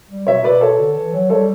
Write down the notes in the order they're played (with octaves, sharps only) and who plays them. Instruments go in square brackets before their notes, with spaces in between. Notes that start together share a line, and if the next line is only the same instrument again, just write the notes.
[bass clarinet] G3
[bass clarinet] B2 [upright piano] C#5 E5
[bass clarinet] B2 [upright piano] B4 D5
[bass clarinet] B2 [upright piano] A4 C#5
[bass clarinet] D3
E3
F#3
[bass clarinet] G3 [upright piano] A4 C#5